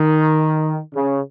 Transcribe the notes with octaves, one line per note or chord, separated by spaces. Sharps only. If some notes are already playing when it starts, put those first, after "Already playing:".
Already playing: D#3
C#3